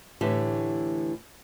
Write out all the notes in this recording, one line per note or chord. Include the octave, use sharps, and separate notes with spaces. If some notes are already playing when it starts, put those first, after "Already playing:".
A2 D3 E3 G4